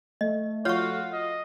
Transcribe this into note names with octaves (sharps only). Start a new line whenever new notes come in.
A3 D#5
F4 F#4 C#5 C#6
D#5